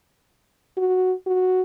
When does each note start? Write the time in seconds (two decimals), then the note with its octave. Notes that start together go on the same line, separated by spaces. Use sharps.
0.77 F#4
1.27 F#4